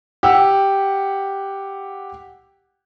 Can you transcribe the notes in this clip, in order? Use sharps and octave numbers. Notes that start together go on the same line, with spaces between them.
G4 F#5 E6